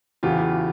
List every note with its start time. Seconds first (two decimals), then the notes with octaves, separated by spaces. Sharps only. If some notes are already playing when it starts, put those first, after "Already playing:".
0.23 E2 C#3 F#3 F4 G4